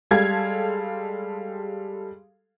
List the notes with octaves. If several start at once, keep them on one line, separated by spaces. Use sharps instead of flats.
G3 G#3 A4 F5 G#6